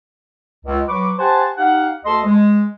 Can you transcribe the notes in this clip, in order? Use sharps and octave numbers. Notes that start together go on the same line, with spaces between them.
C#2
F#3 B4 C#6 D6
G4 C5 F#5 G#5 A5
D#4 G4 F5 F#5
D2 A4 D#5 C6
G#3